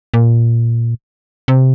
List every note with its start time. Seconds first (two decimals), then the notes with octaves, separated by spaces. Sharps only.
0.14 A#2
1.48 C3